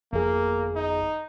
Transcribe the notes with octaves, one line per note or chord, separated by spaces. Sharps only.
G1 F2 A#3 G#4
D#4